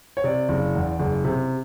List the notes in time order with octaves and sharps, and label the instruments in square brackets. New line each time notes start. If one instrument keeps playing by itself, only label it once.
[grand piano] C#5
C3 D5
F#1
E2
F#1
C3